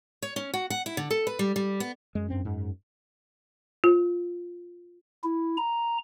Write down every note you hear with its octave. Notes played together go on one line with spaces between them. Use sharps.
C#5
C#4
F#4
F#5
E4
D3
A4
B4
G3
G3
B3
F#2 G#3
G2 C4 C#4
G#2
F4
E4
A#5